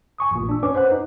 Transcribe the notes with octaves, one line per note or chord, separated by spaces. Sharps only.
G#5 C#6 D#6
A1 A#2
D4 E6
C#4 B4 D6
B4 C5 F#5 F#6
D#4